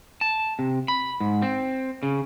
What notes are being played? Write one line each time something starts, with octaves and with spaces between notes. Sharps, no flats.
A5
C3
B5
G#2
C4
C#3